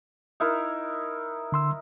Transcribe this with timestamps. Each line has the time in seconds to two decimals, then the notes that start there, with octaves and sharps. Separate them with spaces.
0.40 D#4 E4 A#4
1.52 D3 C6 E6